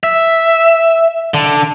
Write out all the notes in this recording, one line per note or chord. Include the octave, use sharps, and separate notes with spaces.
E5
D3